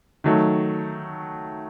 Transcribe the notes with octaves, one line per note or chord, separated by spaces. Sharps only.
D#3 F#3 A3